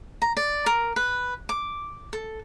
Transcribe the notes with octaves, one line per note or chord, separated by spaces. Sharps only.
A#5
D5
A#4
B4
D6
A4